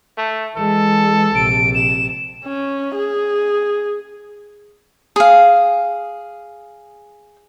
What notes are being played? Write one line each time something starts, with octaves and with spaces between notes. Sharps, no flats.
A3
E3 G#3 A4
A#1 C3 D7
E7
C#4
G#4
G#4 F5